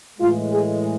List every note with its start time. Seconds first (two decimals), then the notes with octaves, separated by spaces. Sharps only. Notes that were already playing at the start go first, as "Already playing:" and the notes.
0.19 A2 E3 G#3 F4
0.50 G#4